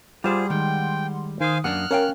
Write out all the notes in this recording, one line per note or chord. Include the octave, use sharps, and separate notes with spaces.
G3 F4 G#4 C5 D5 F#5 C6
D#3 G#3 G5
D#3 C5 F5 G#5 D#6
F#2 A#3 D4 F#5 D#6 F6 F#6
C#4 A#4 C#5 F5 G5